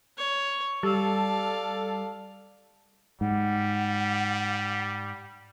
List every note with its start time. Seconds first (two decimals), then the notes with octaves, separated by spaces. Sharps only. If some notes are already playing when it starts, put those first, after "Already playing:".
0.18 C#5
0.83 G3 A4 D5 F5
3.21 G#2 G3 F#5